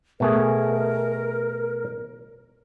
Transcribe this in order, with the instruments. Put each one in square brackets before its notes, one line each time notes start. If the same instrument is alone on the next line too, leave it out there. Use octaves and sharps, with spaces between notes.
[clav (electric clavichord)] B2 A3 G#4 [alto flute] A#4